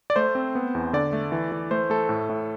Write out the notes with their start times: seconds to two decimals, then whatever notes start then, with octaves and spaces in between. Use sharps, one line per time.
0.10 D5
0.16 A3 C5
0.35 C4
0.55 B3
0.75 E2
0.93 D3 D5
1.13 A3
1.32 E3
1.52 E3
1.71 A3 C5
1.90 A3 A4
2.09 A2
2.30 A2